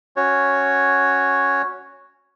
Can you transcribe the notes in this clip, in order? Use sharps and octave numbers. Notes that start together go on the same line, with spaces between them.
C#4 F#4 C#5